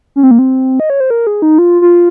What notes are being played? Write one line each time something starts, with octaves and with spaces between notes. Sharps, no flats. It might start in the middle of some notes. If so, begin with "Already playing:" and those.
C#4
C4
A#3
C4
D#5
C#5
C5
A#4
G#4
D#4
F4
F4